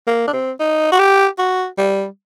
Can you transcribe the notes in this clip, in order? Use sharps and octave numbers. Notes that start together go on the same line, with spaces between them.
A#3
D4
C4
D#4
F#4
G4
F#4
G3